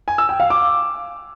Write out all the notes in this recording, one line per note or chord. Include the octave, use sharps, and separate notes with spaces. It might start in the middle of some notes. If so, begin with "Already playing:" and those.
G#5
E6
G5
F5
D6